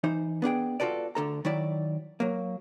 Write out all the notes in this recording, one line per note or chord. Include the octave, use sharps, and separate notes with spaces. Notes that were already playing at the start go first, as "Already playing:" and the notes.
E3 D#4 C5
B3 D4 G#4 G5
F4 F#4 A4 B4 D5
D2 D3 A4 A#5
D#3 F#3 E4 D5
F#3 A#3